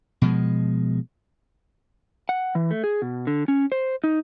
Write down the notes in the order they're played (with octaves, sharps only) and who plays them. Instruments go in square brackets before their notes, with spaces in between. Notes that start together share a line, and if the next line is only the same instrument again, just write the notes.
[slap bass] B2 F3 G#3
[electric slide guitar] F#5
E3
A3
G#4
B2
D3
C#4
C5
D#4